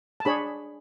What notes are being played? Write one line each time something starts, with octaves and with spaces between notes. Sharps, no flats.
A5
D4 G#4 C#5 B5